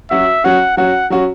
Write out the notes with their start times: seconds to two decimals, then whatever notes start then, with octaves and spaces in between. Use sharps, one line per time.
0.11 F#3 C#4 F#4 E5
0.44 F#3 C#4 F#4 F#5
0.77 F#3 C#4 F#4 F#5
1.10 F#3 C#4 F#4